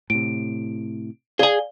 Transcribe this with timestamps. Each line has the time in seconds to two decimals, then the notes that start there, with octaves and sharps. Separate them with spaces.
0.10 A2 C3 D7
1.39 G#4 D5 F5 G#5 G7